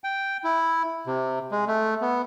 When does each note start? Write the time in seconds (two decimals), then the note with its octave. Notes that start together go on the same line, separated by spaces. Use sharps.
0.04 G5
0.44 E4
1.07 C3
1.52 G#3
1.68 A3
2.02 B3